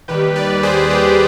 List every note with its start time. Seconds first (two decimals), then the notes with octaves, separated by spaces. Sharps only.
0.08 D#2 D#3 G3 G4 B4
0.36 B4 D5
0.63 G#4 C5
0.90 G4 B4